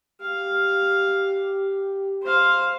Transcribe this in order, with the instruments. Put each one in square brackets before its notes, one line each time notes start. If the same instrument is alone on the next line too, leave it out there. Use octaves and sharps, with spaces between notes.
[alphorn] G4 [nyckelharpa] F5
[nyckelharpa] C5 F5